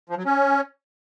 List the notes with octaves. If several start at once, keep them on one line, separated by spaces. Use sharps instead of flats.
F3
F#3
C#4